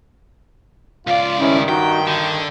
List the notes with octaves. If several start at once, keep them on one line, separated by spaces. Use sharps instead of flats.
C#2 F4 D5
G2 D#3 C#4 E4
D#4 F#4 G5
D3 G5